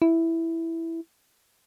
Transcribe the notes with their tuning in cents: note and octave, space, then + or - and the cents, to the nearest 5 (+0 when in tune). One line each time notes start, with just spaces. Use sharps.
E4 +0